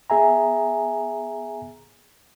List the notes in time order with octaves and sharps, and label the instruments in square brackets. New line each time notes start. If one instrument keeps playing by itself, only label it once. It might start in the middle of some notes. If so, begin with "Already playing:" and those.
[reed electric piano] B3 G#4 E5 G#5 A#5